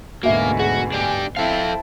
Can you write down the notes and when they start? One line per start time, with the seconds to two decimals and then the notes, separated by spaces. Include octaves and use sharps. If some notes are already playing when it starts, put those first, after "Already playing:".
0.23 D2 G#2 B2 A#3 F#4 E5 G#5
0.59 F#4 G#4
0.92 D4 G4
1.37 C4 E4 A4 F5 A5